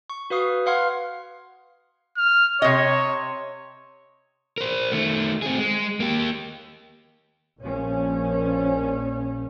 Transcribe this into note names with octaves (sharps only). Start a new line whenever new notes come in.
C#6
F#4 B4 F5 D#6 C7
B4 F5 F#5 C6 F6 G#6
F6
C3 C#5 D#5
A#4 C5
D#3 A3
C4 G#4
G#3
A#3 G4
A#1 A#2 F3 C#4